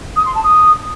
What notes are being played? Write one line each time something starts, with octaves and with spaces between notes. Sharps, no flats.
D#6
C6
A5
D#6